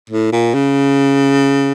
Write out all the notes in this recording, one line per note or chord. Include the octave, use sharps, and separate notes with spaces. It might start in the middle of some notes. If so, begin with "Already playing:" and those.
A2
A#2
C#3